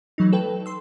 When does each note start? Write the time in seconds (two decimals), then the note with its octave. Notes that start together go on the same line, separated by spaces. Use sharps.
0.18 E3 F#3 A3 D#4
0.33 A4 B4 G5
0.66 C6 E6